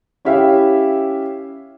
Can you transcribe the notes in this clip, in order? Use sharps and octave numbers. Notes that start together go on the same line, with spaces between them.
C#4 E4 G4 E5 F5